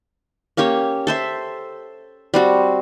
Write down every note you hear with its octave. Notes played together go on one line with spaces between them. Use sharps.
A#3 C#4 G4 C#5
A4 C5 E5
G3 C4 F#4